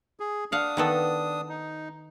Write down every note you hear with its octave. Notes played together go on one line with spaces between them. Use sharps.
G#4
D4 F5 F#5 D#6
D#3 B3 A4
D#4